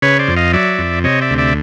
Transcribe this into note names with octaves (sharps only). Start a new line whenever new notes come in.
C#3 B4 C#5
C5 D5
F2
D#5 F5
F#3 D5 E5
F2
C3 C#5 D#5
D5 E5
D2
D5 E5